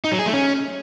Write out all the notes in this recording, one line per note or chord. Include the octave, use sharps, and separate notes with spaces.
D#4
F#3
G#4
A3
C#4